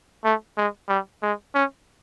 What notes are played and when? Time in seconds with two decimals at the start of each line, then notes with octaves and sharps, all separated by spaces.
0.25 A3
0.57 G#3
0.89 G3
1.23 G#3
1.55 C#4